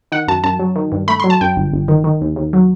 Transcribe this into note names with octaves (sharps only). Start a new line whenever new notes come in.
D#3 F#5
F#2 A5
F#2 A5
F#3
D#3
G2
A3 B5
C6
F#3
A5
F#2 G5
G1
G1
D#3
D#3
D#2
D#2
F#3